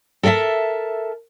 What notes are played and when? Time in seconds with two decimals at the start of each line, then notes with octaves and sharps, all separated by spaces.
0.23 A4 A#4 D5 E5 A5